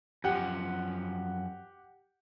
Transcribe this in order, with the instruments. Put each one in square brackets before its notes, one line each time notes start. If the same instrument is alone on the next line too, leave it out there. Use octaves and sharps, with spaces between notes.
[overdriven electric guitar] F#2 F3 [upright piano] G4 F#5